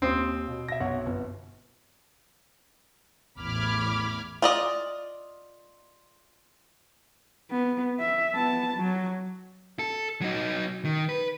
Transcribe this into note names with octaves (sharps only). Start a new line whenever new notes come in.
D#2 C4 C6 D#6
B2
E5 A#6
B1 C#5 F#5
G1
A1 E2 B5 D6 F6 G#6
F4 D5 D#5
B3
E5
B3 A5
F#3
A4
F#3 D#4
D#3
B4